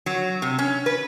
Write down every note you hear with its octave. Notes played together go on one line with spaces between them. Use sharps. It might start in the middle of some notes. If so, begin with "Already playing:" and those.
F#3
C3
C#4
B4